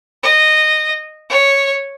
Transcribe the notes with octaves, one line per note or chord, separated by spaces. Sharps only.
D#5
C#5